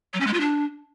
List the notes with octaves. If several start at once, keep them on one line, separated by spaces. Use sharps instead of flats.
F#3
C#4
G#3
F4
D4